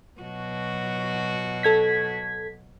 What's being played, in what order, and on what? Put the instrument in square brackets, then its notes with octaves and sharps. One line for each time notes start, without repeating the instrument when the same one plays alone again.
[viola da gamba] B2 F#3 F#4
[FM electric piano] A4 G#6 B6